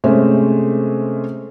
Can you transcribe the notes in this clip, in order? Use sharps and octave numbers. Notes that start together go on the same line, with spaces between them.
C3 G#3 A3 C#4 C5